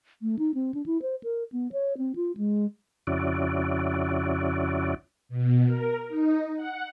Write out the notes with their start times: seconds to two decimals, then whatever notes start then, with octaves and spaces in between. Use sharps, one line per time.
0.22 A3
0.39 D#4
0.54 C4
0.74 D4
0.86 E4
1.02 C5
1.23 A#4
1.52 B3
1.72 C#5
1.98 C4
2.16 F4
2.37 G#3
3.07 F2 C#3 C#4 E4 F#4 D5
5.29 B2
5.66 A#4
6.08 D#4
6.56 F#5